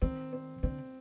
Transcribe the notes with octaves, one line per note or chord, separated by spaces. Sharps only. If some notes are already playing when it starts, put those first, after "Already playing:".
D#3 C4
C4
D3 C4